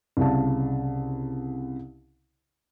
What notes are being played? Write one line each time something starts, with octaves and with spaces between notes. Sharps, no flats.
C2 C#3 A5